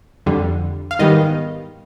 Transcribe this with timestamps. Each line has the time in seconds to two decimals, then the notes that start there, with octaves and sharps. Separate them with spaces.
0.26 F2 D3 G3
0.91 F5
0.99 G#2 D#3 G3 B3 D#5